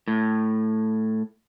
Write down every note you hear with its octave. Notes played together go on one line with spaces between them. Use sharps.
A2